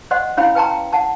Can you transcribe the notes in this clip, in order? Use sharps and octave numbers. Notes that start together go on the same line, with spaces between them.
C5 D5 D#5 F#5 C6
C#4 E4 C#5 F5 G5 B5
B4 G5 A5 A#5 C6
G5
F#5 A5